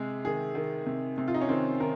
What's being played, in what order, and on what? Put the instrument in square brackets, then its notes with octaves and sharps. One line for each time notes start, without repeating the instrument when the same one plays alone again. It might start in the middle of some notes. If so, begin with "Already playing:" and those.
Already playing: [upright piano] C3 G#3 G#4
D#3 G#4
D#3
C3
C3
F4
D#4
C#4
D#3 C4
D#3 A#4